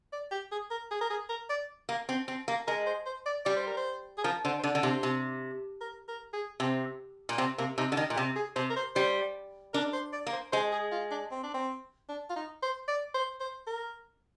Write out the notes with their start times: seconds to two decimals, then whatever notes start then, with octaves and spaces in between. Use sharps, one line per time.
0.13 D5
0.31 G4
0.52 G#4
0.71 A#4
0.91 G#4
1.01 A#4
1.10 G#4
1.29 A#4
1.50 D5
1.89 A#3
2.09 C4
2.28 C4
2.48 A#3
2.68 G#3 A#4
2.86 C5
3.06 C5
3.26 D5
3.45 G3 D5
3.56 C5
3.67 A#4
3.77 C5
4.18 G#4
4.24 F3 A#4
4.45 D3 C5
4.59 C5
4.63 D3 D5
4.75 D3
4.83 C3 C5
5.03 C3
5.81 A#4
6.08 A#4
6.33 G#4
6.60 C3 C4
7.29 A#2
7.38 C3 C4
7.58 C3 A#3
7.78 C3 D#4
7.92 D3
7.97 D#3
8.10 A#2
8.16 C3 G4
8.36 G#4
8.56 C3 C5
8.70 A#4
8.76 C5
8.95 G3 C5
9.74 D4 A#4
9.93 C5
10.13 D5
10.27 A#3
10.33 C5
10.52 G#3 C5
10.72 G#4
10.92 F4
11.11 D4
11.31 C4
11.43 D4
11.54 C4
12.09 D4
12.30 F4
12.36 D#4
12.62 C5
12.88 D5
13.14 C5
13.40 C5
13.67 A#4